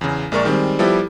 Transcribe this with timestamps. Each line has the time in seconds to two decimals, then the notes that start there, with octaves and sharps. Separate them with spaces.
0.01 E2 C#3
0.32 A#1 G#3 A#4 D5 C#6
0.45 D#3 G3 G#3 C4
0.79 F3 G3 B3 E4 G4 A4